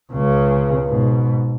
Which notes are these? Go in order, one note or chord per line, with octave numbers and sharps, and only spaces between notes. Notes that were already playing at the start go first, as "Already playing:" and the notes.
C#2 C#3
G#2 B2